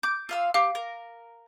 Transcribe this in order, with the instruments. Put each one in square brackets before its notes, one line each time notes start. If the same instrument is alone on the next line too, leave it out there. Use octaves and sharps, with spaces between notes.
[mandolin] D6 [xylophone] G6
[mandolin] F4 F5 E6
[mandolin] G4 [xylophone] F5 D6
[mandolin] A#4